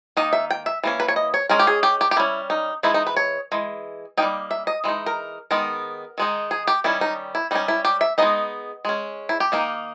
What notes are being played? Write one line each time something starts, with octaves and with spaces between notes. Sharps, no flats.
D#3 A#3 D#4 D#5
E5
G5
E5
E3 A#3 C#4
B4
C#5
D#5
C#5
G#3 C#4 A#4
G4
G#4
G4
G4
G4
G3 C#4 E4
D#4
E3 G#3 D#4 E4
D#4
B4
C#5
E3 G#3
G3 A#3 D#4 G5
E5
D#5
E3 G#3 D#4
A#4
D#3 G#3 B3 A#4
D#3 G#3 D#4
G#4
G4
D#3 G3 C#4 E4
D#4
E4
G3 C#4 D#4
E4
G4
E5
G#3 B3 D#4 D#5
G#3 C#4
E4
G4
D#3 A#3 D#4